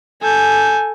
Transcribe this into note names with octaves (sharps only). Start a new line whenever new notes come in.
A4 G#5 G6